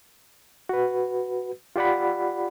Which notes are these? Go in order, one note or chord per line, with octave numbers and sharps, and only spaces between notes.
F#4 B4
F4 G4 D5 F#5 B5